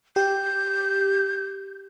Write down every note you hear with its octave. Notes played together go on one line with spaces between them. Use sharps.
G4 G6